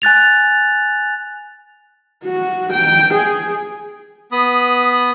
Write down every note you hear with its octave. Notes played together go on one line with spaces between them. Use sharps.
G#5 F#6 A6 F7
F#4
G5
G#4
B3 B5 D#6